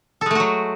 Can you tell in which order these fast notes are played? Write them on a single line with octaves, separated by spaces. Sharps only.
A4 G#3 A3 F#4 F#3